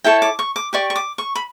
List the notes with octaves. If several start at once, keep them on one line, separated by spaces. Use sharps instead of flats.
E4 A4 C#5 G5
D6
C#6
D6
G4 D5 C#6
C#6
D6
C#6
B5